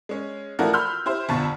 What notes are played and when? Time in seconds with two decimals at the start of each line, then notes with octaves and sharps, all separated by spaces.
0.09 G#3 C#4
0.59 E3 F3 A3 F#4 A#4 D5
0.73 B5 C6 E6 F6 G6
1.06 E4 G4 C5
1.29 G1 F2 B2 A5 C#6 A6